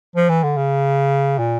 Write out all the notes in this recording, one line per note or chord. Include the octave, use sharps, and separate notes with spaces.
F3
E3
D3
C#3
A#2